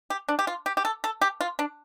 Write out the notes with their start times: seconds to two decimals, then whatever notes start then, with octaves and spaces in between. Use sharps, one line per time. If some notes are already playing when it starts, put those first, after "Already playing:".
0.10 G4
0.29 D4
0.39 G4
0.47 F4
0.66 G4
0.77 G4
0.85 A4
1.04 A4
1.21 G4
1.41 F4
1.59 D4